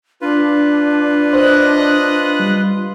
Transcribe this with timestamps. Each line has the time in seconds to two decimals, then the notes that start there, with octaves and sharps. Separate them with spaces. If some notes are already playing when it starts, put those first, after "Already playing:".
0.21 D4 F4 B4
1.33 C5 D#5 F#6
2.40 G3